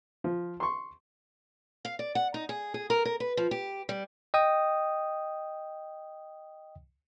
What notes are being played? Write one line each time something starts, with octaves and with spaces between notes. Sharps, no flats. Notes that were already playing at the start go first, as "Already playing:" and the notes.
F3
C6 C#6
F5
D5
F#5
D#4
G#4
G#4
A#4
A#4
B4
F3
G4
G3
D#5 G5 D#6